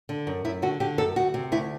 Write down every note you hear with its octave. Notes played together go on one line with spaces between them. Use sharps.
D3
F#2
F#2 E4
D3 F#4
D3 G4
F#2 A4
D2 F#4
C3
D2 E4